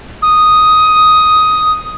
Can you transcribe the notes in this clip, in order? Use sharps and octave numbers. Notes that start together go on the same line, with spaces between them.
D#6